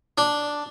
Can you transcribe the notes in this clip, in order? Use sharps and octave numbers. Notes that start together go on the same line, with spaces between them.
D4